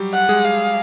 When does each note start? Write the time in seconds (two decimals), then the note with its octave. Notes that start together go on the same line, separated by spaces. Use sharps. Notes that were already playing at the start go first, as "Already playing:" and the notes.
Already playing: F#3 G3 G4
0.14 F#5
0.29 G#3 G#4
0.45 F5